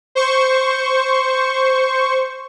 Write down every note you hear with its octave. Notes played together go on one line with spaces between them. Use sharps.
C5 C#6